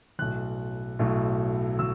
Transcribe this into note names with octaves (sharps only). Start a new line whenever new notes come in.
B1 A2 F#3 F#6
B1 A2 F#3
F#3 E6